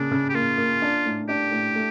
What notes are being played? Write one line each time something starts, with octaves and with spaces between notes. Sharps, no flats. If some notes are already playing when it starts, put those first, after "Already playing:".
Already playing: C#3 A#3 D4
C#3
G4
A#3 F4
A#3
D4
A2
D4 G4
A2
A3